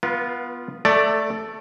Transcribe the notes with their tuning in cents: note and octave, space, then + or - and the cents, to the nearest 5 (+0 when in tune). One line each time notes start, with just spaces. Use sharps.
B3 +0 F4 +0 B4 -40
A3 +0 A4 +25 D5 +0